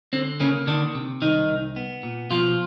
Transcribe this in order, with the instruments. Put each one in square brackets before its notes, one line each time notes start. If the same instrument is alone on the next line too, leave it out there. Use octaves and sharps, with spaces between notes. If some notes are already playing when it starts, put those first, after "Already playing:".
[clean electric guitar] D3 C4
C#3 A#3 C#4
D3 D#3 D4
C3
C2 D#3 D#4
C2
B3
A#2
B2 F3 F4